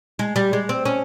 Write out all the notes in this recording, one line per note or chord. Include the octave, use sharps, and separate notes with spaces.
G#3
G3
G#3
C4
C#4